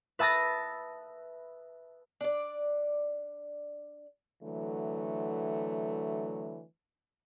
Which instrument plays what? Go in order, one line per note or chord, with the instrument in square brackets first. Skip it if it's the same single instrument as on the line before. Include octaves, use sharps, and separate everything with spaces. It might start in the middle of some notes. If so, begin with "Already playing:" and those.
[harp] B4 E5 A5 D#6 A6 A#6
[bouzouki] D4 D5
[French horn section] D3 E3 F#3 A3